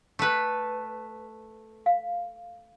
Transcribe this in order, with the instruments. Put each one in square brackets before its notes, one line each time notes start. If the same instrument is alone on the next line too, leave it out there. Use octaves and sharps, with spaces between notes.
[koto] A3 B4
[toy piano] F5